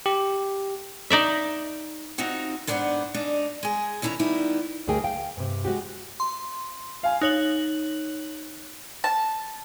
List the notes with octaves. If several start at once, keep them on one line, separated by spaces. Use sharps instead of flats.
G4
D#4 D5 E5
C4 D#4 F4 F#4 F#5
G#2 B3 D4 C5 C#5 F#5
G#2 D4 D#4
G#3 G#4
D#2 C#4 E4 A5 A#5
G3 B3 D#4 E4
D2 G3 A3 G#4 A#4 G5
F5 G5
G2 C3
G#3 F#4 G4
C6
F5 G#5
D#4 C#5 F#6 F#7
A5